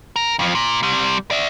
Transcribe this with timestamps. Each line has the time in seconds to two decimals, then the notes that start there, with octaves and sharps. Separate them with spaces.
0.16 A#4
0.39 F2 F3
0.55 A#2
0.83 C3 G3
1.31 D5 E5